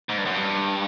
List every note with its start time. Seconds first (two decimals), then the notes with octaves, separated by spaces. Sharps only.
0.09 G#2
0.18 G2
0.25 F#2
0.34 G2